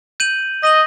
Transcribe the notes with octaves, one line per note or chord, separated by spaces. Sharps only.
G6 D#7 F#7
D#5 A#6 D#7 F#7